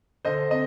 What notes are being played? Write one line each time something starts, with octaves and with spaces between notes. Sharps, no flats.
D3 C5 D#5
C4 D#5